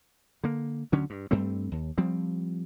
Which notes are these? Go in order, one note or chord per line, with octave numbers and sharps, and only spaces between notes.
D3 A#3
D2 D3 F#3 C#4
G2
G2 G3 A3 C4
D#2
F3 G3 C4